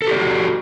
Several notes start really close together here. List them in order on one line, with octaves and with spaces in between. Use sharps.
A4 G4 D5 F#4